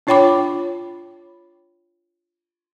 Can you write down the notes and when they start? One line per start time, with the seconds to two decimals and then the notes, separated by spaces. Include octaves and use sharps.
0.07 D4 F4 C#5 G5 B5 D6